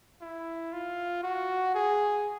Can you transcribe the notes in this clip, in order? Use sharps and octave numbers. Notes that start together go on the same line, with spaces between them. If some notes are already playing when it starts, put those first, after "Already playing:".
E4
F4
F#4
G#4